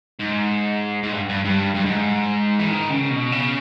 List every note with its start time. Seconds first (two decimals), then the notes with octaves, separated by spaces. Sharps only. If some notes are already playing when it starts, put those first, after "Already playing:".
0.19 G#2
1.03 G#2
1.12 G2
1.29 G2
1.45 G2
1.75 G2
1.86 G#2
2.59 E3
2.69 D#3
2.90 C#3
3.11 B2
3.32 C#3